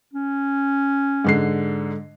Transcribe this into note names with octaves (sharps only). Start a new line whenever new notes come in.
C#4
G#2 D3 C7